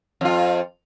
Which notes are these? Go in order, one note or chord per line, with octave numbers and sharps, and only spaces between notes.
F2 F4